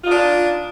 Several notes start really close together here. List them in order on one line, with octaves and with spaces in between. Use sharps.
F4 D#4 D4